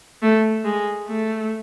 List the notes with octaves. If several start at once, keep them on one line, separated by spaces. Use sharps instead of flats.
A3
G#3
A3